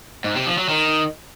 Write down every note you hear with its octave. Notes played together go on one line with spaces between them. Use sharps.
G#2
C3
F3
F#3
D#3